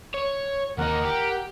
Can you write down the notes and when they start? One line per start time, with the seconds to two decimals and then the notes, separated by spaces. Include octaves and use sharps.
0.14 C#5
0.78 D#2 D#4 A#4 F#5
1.05 G4